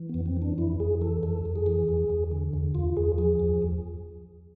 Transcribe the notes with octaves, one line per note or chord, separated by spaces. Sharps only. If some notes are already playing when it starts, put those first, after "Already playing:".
Already playing: E3
F2 B3
C4
E3
D4
F2 E4
F2 G#4
E3 A4
F2 A4
F2
G#4
E3
E2
E2
D3
E2
E2 F4
E2 G#4
F3 G#4
E2
E2